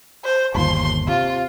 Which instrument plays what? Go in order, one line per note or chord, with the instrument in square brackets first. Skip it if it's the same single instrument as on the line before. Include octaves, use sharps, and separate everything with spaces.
[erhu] C5
[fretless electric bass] G1 D#2 F3 [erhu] C6
[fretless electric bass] C3 [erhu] F4